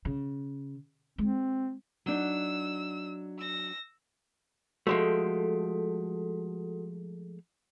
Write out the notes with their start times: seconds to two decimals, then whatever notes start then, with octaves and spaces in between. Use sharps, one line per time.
0.05 C#3
1.18 G#3 C4
2.06 F#3 D4 D#4 E6
3.38 E6 A#6
4.87 F3 G#3 A3 F#4 A4